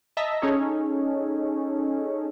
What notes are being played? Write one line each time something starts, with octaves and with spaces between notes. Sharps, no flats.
D#5 E5 A5 A#5 A#6 B6
C#4 D#4 G#4 A4 C#5